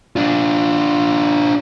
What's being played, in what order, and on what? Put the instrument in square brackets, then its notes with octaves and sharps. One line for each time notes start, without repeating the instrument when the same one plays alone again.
[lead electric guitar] D4 F4